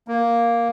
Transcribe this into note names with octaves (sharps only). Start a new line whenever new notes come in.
A#3